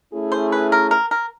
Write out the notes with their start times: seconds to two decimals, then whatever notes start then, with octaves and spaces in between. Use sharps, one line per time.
0.12 A3 C#4 E4 G#4
0.32 C5
0.52 B4
0.72 A#4
0.91 A#4
1.11 A#4